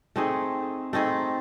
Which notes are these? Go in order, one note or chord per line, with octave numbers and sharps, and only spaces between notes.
A3 C4 D#4 G#4
A3 C4 D#4 G#4